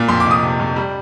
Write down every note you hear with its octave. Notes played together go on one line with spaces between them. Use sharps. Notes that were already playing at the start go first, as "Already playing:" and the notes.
Already playing: A#2
F2 C6
D6
F1
D#6
C3
F2
G3